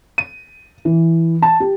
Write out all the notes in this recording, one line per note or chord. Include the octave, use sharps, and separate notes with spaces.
D#7
E3
A5
G4